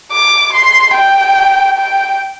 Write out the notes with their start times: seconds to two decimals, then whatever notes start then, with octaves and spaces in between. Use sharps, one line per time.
0.12 D6
0.53 C6
0.94 G5
1.78 G5